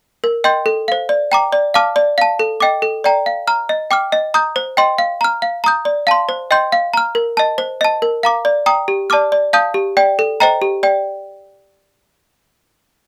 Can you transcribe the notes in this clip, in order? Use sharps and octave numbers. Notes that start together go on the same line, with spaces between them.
A#4
D#5 G5 C6 G6
A4
C5 F5
D5
G5 A#5 D6
D5
F5 A5 D6 F6
D5
F5 A5
A4
D#5 G5 D6
A4
D5 G5 A#5
F5
A#5 F6
D#5
G5 D6 F6
D#5
A#5 D#6 G6
C5
D#5 G5 C6
F5
A#5 F6
F5
A#5 D#6 G6
D5
F5 A5 C6
C5
D#5 G5 C6 G6
F5
A#5 F6
A#4
D#5 A5
C5
D#5 A5
A#4
F5 A#5 D6
D5
G5 A#5 D#6
G4
D5 A5 D6 F6
D5
F5 A5 D#6 G6
G4
D5 G5
A4
C5 D#5 G5 A#5
G4
D5 G5